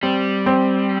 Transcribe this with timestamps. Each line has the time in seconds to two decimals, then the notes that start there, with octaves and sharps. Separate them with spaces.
0.03 G3 C4
0.46 C4